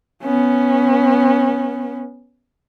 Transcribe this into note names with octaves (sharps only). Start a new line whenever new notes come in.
B3 C#4